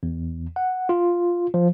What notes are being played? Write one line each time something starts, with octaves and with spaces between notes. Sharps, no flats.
E2
F#5
F4
F3